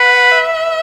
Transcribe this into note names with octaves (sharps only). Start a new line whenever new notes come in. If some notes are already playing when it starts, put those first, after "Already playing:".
Already playing: B4 F#5
E5